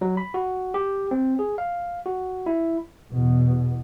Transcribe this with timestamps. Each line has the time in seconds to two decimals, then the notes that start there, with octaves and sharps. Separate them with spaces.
0.01 F#3
0.17 B5
0.34 F#4
0.74 G4
1.11 C4
1.39 G#4
1.58 F5
2.06 F#4
2.46 E4
3.12 E2 B2